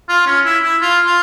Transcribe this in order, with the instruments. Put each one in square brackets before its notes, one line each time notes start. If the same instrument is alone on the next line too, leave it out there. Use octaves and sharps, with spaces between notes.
[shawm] F4
C#4
E4
E4
F4
F4